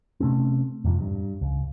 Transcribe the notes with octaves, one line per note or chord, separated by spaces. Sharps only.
C3 A3 C4 C#4
F2 G#2 C3 F3
G2
C#2